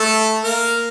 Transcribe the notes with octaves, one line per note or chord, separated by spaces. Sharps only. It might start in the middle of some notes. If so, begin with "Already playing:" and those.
Already playing: A3 A4
A#3 A#4